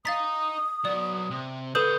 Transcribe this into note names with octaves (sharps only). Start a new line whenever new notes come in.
D#5 F5 A#5 D#6 A6 B6
F#3 B3 D5
C3
D3 A4 B4 C#5 D#6 G6 E7